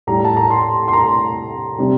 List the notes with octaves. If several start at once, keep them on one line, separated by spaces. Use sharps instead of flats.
A2 G3 A#5
A5
A#5
C6
C6
A#5
C3 G3